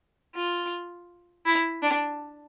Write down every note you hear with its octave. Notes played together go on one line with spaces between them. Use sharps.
F4
E4
D4